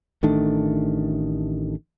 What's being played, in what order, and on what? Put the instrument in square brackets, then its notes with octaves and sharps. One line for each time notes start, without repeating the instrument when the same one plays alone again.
[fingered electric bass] A1 D#3 A3 D4